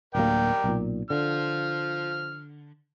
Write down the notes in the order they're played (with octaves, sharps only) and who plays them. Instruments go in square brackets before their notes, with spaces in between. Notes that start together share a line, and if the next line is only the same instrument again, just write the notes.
[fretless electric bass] D1 D2 A#3 [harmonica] A#4 D5 G5
[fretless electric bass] B1 A#2
[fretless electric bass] D3 [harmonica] F3 F6